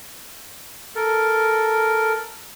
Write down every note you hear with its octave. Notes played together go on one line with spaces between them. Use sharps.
A4 A#4